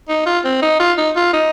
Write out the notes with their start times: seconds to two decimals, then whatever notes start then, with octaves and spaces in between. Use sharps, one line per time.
0.09 D#4
0.26 F4
0.44 C4
0.62 D#4
0.80 F4
0.97 D#4
1.16 F4
1.33 D#4